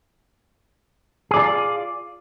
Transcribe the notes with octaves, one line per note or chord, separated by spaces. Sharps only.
F4 G#4 D5